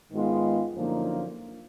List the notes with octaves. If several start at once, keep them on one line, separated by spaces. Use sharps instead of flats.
G#2 D#3 G#3 B3 F4
F#2 D3 F3 A#3 D#4